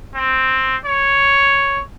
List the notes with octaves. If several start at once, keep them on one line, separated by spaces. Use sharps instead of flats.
C4
C#5